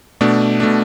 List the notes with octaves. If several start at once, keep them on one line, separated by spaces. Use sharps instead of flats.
B2 A3 D4
B2 A3 D4